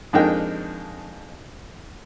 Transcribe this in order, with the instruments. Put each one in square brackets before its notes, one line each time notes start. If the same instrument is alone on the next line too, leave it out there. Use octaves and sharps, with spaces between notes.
[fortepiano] F2 G#3 D4 D#4 A#4 G5